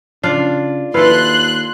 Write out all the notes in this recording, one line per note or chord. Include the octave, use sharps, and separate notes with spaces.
C#3 D4 F4
D#2 E4 F4 A4 B4 C6 F#6